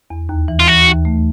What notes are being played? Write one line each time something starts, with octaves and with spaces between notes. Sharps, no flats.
E2
D#2
E3
F4
E3 F#4
D#2
A3